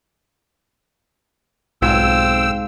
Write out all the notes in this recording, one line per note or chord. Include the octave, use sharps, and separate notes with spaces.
B1 G#2 C4 F4 G#5 E6